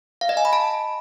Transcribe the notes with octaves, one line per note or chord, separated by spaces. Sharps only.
F5
D#5
G#5
B5
A5